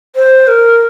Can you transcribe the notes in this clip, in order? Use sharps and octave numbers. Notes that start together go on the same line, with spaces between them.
C5
A#4